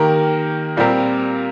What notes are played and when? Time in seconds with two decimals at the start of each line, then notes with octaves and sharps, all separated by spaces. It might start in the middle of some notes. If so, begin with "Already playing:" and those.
Already playing: D#3 A#3 G4 A#4
0.77 A#2 G3 C4 G4 A#4